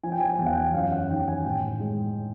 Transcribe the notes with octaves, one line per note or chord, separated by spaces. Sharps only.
F3 G#5
G5
G#5
E2 G5
F#5
G5
F#2 F5
F#5
D#3 G5
G#5
A2 G5
G#3